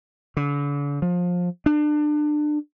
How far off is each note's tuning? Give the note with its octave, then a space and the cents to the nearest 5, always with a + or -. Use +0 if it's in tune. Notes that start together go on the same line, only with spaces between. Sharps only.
D3 -40
F3 +25
D4 +30